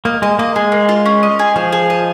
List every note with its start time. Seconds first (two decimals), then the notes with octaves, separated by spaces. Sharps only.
0.05 A#3 D#5
0.22 G#3 D#5
0.39 A#3 D#5
0.56 G#3 G#4
0.72 A#3
0.89 F4
1.06 C#4
1.23 D#5
1.39 G#4
1.56 F3 G#4
1.73 G#4
1.90 D#5